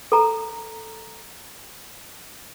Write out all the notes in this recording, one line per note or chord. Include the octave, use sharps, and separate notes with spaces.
A4 A#5